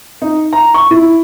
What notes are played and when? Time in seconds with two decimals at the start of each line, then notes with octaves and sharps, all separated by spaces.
0.22 D#4
0.53 A#5
0.74 C#6
0.91 E4